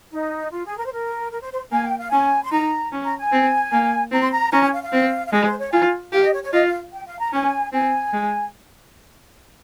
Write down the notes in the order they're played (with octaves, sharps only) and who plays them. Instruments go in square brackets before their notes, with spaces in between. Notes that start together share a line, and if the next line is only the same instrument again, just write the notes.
[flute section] D#4
F4
G#4
A#4
C5
A#4
A#4
C5
C5
[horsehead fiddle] A#3 [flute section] G#5
[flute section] G5
F5
[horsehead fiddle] C#4 [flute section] G#5
[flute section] C6
[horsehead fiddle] D#4 [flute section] A#5
[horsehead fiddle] C#4
[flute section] A#5
G#5
[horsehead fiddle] C4
A#3
[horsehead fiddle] C4 [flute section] A#5
[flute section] C6
A#5
[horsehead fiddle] C#4 [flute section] A#5
[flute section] G#5
F5
F5
[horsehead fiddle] C4
[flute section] F5
[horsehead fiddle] G#3 [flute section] D#5
[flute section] C5
C#5
[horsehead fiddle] F4 [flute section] G#5
[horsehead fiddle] G4 [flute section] F5
[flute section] D#5
C#5
C#5
[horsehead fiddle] F4 [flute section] D#5
[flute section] F5
G5
F5
A#5
[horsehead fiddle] C#4 [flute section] G#5
[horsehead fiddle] C4 [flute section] G#5
[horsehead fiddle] G#3